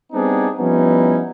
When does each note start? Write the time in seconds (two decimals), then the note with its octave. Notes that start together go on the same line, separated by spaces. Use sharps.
0.13 G3 B3 C4 D4 D#4 G#4
0.58 F3 G3 B3 C#4 D#4 E4